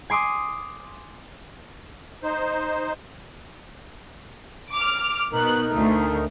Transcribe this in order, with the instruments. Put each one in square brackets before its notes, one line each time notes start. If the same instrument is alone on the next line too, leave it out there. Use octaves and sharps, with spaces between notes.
[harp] G#5 C6 D6 D#6
[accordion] D#4 C5
[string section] D6 F6
[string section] B2 B3 F#6 [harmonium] D#4 A#4
[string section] D2 A3